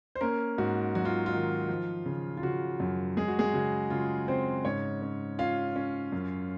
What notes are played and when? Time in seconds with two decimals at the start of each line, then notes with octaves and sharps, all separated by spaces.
0.15 C5
0.21 A#3 C#4 A#4
0.58 G#2 F#4
0.95 F#3 F#4
1.05 F4
1.26 F4
1.33 D#3
1.69 F3
2.05 C#3
2.37 F4
2.43 C#3 F#4
2.80 F#2
3.17 G#3 G#4
3.28 F#4
3.39 G#3 G#4
3.53 C#3 F#4
3.90 C#3 F4
4.28 C#3 C4 C5
4.65 G#2 C#4 C#5
5.02 C#4
5.39 C#4 F4 F5
5.76 C#4
6.12 F#2